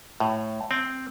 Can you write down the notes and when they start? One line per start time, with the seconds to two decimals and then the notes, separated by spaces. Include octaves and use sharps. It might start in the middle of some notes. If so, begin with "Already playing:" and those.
0.20 A2
0.71 C4